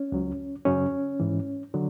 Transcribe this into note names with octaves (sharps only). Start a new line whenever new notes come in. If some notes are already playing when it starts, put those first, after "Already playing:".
Already playing: C#4
C#2 C#3 F#3
F#2 C#3 F#3 C#4
G#2 E3
D3 F#3